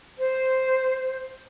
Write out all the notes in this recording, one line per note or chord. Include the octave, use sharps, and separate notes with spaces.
C5